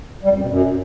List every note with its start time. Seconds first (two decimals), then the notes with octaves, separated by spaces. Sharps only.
0.24 G3
0.30 F2
0.36 F#2
0.42 B2
0.49 F#2